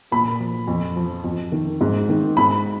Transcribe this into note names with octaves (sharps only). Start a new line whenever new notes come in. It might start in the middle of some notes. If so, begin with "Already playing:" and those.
A#2 B5
F3
F2
F3
F2
D#3
G#2
D#3
G#2 B5